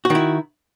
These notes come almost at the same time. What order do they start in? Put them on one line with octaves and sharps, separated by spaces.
F#4 D#3 E4